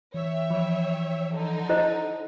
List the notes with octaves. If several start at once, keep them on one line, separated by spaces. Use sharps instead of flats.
E3 C#5 E5 G5
F3
D3 D#4 A4
E4 C5 D#5